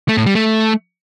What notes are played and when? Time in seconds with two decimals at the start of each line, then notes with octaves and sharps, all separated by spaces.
0.08 A3
0.17 A2
0.26 G3
0.35 A3